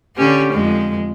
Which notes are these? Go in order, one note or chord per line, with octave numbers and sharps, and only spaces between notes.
D3 C#4 G4
F2 G#3